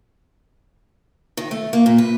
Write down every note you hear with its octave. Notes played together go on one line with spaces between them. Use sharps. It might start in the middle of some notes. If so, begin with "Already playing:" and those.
D#3
A3
A#3
A#2
B4